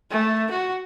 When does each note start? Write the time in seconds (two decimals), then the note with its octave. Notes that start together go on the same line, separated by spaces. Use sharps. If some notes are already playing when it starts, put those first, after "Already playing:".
0.11 A3
0.51 F#4